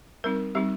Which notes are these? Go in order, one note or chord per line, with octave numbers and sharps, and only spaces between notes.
G3 C4 D#4 A#4
G3 C4 D#4 G4